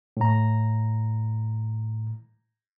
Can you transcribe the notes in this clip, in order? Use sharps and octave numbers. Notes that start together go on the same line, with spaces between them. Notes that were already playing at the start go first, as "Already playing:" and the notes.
A2 A#5